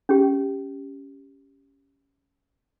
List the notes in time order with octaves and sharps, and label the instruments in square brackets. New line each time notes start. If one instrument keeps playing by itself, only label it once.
[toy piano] C#4 G4